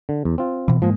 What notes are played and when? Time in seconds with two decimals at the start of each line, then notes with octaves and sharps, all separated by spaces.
0.09 D3
0.25 E2
0.38 C4 F4
0.68 B2 E3
0.82 G#2 F3 G#3 A#3